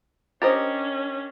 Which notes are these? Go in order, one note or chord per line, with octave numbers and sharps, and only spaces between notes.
C#4 D4 G4 A#4 C5 D#5 A6